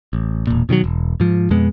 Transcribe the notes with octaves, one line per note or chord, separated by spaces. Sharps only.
A1
E1 A#2
B2 D#3 F3 F#3
E1
G#2 F3
F2 B2 G#3 B3